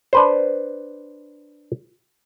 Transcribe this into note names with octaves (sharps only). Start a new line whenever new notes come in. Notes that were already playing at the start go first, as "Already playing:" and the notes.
D4 B4 C5